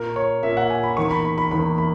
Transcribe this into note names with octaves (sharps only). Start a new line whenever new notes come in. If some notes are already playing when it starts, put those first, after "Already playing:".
Already playing: A#2 A#3 A#4
C#5
A#2 A#3 E5
F#5
G#5
B5
E2 D#3 A#3 C#6
B5
B5
B5
E2 D#3 A#3 B5
B5